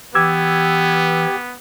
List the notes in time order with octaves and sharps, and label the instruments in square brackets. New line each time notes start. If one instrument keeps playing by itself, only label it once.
[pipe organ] E3 [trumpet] B3 [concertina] G4 [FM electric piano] D6 E6 G#6